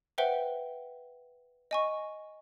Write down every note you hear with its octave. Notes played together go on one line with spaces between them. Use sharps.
B4 C5 E5 F#5 G5 G7
D#5 G#5 C#6